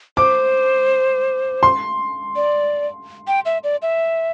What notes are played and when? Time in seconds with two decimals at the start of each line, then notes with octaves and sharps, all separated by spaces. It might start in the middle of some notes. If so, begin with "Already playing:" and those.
0.17 C5 D6
1.63 C6
2.36 D5
3.27 G5
3.45 E5
3.64 D5
3.82 E5